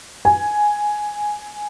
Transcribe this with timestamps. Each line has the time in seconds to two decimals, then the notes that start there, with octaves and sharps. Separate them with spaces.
0.25 G#5